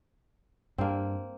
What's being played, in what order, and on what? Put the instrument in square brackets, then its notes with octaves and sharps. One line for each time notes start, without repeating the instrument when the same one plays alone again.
[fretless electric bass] G2 D4 [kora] A#3 C4